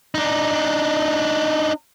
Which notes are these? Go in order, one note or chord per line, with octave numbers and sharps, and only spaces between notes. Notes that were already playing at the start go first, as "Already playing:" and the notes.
D4 D#4